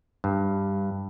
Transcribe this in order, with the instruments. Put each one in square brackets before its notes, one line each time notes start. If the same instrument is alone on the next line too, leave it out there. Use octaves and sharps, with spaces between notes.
[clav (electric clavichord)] G2